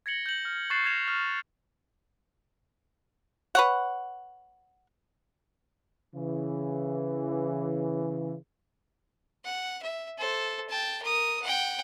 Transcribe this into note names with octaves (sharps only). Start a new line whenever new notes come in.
G#6 A#6 C#7 F#7 G7
G6 F#7
F6
C#6 F#6 A6 C7 E7 F#7
F6 G#6 A#6 E7 F7
F6
B4 C#5 F#5
C#3 E3
F#5
E5
A4 C5
G5 A5
A#4 D#6
F#5 G5